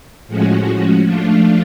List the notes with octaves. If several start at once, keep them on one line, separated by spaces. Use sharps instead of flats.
A2 F3 G#3 C#4 F#4
F3 A3 D4 F4